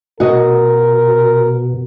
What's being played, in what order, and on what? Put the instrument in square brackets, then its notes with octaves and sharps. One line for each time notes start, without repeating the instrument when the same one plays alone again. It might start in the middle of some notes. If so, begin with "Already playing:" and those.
[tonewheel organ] B2 [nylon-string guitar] F#4 D#5 [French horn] A#4